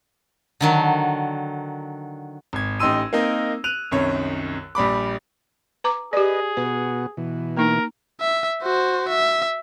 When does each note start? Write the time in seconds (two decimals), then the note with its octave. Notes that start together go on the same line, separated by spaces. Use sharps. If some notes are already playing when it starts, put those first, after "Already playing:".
0.61 D3 D#3 F#3
2.53 G#1 G#6
2.80 A1 D#4 G4 C6 E6 D#7
3.13 A#3 C4 D#4 A#4
3.64 F#6 D#7 F7
3.91 C2 F#2 D#3 C#5
4.75 A#1 G3 B5 D6
5.84 B4 A#5 D6
6.13 G4 G#4 B4 D5 D#5
6.57 B2 B3 F#4 B4
7.17 B2 E3
7.57 A#3 D#4 A#4
8.21 E5
8.63 F#4 C5
9.09 E5